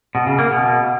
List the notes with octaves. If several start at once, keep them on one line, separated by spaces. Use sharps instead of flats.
B2
C#3
A#3
B2